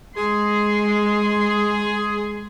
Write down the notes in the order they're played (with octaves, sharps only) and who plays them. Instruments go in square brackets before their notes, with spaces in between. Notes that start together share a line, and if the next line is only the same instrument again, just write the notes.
[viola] G#3 C6 [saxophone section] G#4